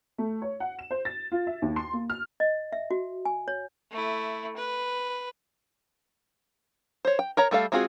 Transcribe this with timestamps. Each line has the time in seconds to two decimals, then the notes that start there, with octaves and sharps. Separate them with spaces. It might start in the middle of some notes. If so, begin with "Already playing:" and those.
0.18 A3
0.42 C#5
0.60 F#5
0.79 E7
0.91 C5
1.05 A6
1.32 F4
1.47 E5
1.62 D#2
1.76 C6
1.93 A#3
2.10 F6
2.40 D#5
2.73 E5
2.91 F#4
3.25 G#5
3.48 C#5
3.91 A3 E4
4.56 B4
7.05 C5 C#5
7.19 G5
7.37 A#4 C#5 A#5
7.51 G3 A3 A4 F5
7.72 G#3 C4 F4 F#4 G#4